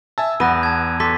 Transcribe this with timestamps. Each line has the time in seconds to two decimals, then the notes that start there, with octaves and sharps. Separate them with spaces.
0.18 E5 G#5 A5 E6
0.40 E2 B3 F#6 A#6 D#7
0.63 A5 G#6
1.00 A4 C6 D6 B6